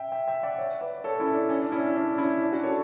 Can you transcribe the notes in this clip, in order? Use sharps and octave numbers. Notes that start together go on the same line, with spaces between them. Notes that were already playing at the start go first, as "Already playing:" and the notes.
Already playing: E5 G5
E5 G5
E5 G5
D5 F#5
C#5 E5
B4 D5
A4 C#5
C#4 E4
D4
C#4
D4
C#4 E4
C#4
D4
C#4 E4
D4
D4 F#4
A4 C#5